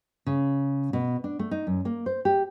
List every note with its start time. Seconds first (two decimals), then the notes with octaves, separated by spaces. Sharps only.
0.27 C#3
0.93 B2
1.24 D4
1.39 A3
1.51 D#4
1.67 F#2
1.85 A#3
2.06 C5
2.25 G4